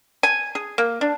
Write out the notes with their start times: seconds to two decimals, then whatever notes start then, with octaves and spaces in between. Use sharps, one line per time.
0.23 G#5
0.55 G#4
0.78 A#3
1.01 D4